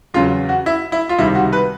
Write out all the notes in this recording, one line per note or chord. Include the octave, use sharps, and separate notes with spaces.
E2 C#3 F#3 F4
F#4
E4
E4
F4
C#2 C3 D#3 G3 E4
F#4
B4